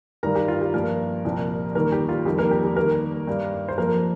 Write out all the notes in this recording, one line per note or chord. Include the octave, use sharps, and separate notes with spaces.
G2 D#3 G3 A#4 A#5
G4
F4
G4
G2 F3 A#3 A#4
C2 A#2 F3
D#2 D#3 G3 A#3 A#4
G4
F4
F2 D#3 G3 G4
A#3 A#4
G4
G4
D#2 D#3 G3 A#3 A#4
G2 G3
C5
F2 F3 A#3 A#4